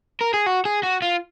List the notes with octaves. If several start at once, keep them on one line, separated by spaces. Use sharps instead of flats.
A#4
G#4
F#4
G#4
F#4
F4